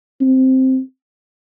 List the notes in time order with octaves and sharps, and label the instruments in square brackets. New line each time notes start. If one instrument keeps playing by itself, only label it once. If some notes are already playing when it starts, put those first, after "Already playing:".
[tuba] C4